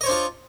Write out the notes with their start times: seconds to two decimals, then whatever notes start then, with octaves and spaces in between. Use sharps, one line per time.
0.01 D#5
0.03 C#5
0.06 C5
0.09 D4
0.11 F4